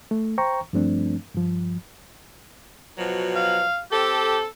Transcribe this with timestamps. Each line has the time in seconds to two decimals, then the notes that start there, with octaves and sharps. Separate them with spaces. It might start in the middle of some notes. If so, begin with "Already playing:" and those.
0.11 A3
0.38 C5 G5 A#5 C#6
0.73 G2 F3 A3 C4 D4
1.34 G2 F3
2.96 B2 F3 F#3
3.36 F5
3.91 C4 G4 A4